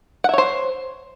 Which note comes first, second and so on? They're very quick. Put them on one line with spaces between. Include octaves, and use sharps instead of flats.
F#5 E5 C#5 C5